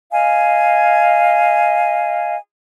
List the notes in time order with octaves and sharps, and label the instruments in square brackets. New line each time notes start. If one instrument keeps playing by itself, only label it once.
[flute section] D#5 F5 G#5